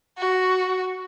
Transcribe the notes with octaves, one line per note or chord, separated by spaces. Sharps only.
F#4